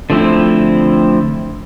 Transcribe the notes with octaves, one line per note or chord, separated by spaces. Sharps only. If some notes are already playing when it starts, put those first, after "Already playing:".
D3 F3 A3 C4 E4